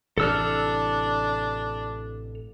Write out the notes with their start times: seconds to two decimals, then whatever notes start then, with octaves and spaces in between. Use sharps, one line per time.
0.18 A1 C3 E3 D4 A4 E6 F6